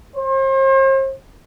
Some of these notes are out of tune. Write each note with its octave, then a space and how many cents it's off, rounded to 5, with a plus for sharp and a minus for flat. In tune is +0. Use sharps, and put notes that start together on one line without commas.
C5 +40